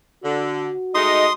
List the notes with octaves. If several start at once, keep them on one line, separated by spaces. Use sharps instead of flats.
D3 F#4
G#3 A3 D#4 D#5 C6 D#6